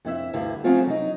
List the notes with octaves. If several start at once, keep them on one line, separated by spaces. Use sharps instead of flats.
F2 E4 E5
D2 G2 D3 E4 F5
F3 F#3 A3 C4 F4 G#4
F#3 D#4